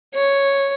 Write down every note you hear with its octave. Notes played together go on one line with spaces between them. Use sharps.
C#5